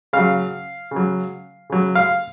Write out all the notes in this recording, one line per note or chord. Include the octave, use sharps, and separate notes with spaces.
C#3 F#3 F5
C#3
F#3
C#3 F#3
F5